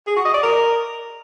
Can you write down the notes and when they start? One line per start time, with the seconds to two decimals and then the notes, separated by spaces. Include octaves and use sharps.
0.07 G#4
0.16 F#4
0.25 D#5
0.34 D5
0.43 A#4